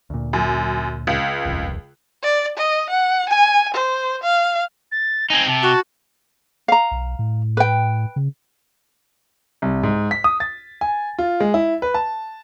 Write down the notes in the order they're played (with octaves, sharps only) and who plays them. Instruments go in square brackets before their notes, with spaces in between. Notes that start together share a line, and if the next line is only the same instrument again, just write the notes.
[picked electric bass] D2 A#2
[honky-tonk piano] F#2
C#2
[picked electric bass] D#1 C2 F2
[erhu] D5
D#5
F#5
G#5
C5
F5
[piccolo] A6
[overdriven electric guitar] C4 D#4 [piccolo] G#5
[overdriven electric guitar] C3 [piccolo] A5
[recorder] F#4
[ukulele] F5 A#5
[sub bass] B1
A2
[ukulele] B4 G5
[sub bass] C#3
[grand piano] C2
G#2
B6
D#6
A6
G#5
F4
G#3
E4
B4
A5